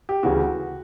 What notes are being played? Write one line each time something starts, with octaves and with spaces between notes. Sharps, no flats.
G4
D2 C#3 E3 F#4